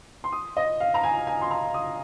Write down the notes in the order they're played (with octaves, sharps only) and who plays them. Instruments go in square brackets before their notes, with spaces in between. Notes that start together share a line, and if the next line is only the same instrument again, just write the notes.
[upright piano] C6
D#6
D#5
F5
A#5
G#5
G#5
C6
A#5
D#6